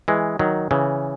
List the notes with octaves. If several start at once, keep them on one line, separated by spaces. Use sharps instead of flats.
E3 G#3
D#3 F#3
C#3 E3